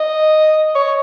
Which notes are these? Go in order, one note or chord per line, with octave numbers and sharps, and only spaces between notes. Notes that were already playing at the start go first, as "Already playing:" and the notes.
Already playing: D#5
C#5